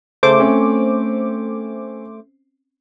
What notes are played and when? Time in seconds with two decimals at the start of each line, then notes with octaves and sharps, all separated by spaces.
0.23 C#3 A3 C5 D6
0.40 C4 C#4